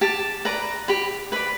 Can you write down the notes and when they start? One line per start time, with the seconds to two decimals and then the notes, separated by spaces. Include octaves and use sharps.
0.01 G4 A5
0.45 B4 D5 A#5
0.88 G4 B5
1.32 B4 D5 B5